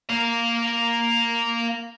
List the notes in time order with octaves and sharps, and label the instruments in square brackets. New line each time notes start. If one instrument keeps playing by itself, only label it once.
[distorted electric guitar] A#3 F5